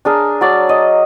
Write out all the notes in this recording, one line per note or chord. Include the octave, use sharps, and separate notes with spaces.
D4 G#4 A#4
F#3 D4 D5
D#5